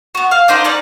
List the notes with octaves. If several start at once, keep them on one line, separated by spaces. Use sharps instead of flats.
B3 F#4
F5
D4 D#4 F4 C5
C#4 D#4 B4 D5